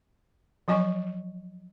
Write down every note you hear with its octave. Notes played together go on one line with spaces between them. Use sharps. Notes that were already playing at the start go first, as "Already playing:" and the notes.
F3 F#3 D#5 G#5 C#6